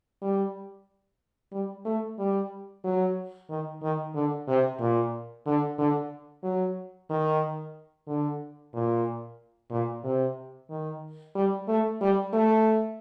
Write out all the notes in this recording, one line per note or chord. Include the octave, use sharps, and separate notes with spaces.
G3
G3
A3
G3
F#3
D#3
D#3
D3
C3
A#2
D3
D3
F#3
D#3
D3
A#2
A#2
C3
D#3
G3
A3
G3
A3